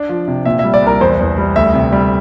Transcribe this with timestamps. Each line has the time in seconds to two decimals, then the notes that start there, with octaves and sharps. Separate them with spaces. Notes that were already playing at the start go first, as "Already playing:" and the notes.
Already playing: D4 D5
0.09 F3
0.28 C3
0.45 A#2 E5
0.59 E5
0.64 G3
0.74 D5
0.82 C2 A#4
1.01 E2 C5
1.19 E2
1.38 G3
1.56 D2 E5
1.74 C3
1.92 G3